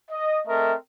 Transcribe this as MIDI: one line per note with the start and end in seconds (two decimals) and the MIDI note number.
0.11 0.40 75
0.47 0.74 57
0.47 0.74 60
0.47 0.74 70
0.47 0.74 75
0.47 0.74 76